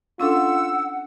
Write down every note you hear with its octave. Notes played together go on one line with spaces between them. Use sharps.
C#4 D4 F4 A4 F#5 E6